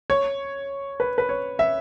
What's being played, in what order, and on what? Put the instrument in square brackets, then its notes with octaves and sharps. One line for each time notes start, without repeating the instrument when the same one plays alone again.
[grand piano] C#5
B4
B4
C#5
E5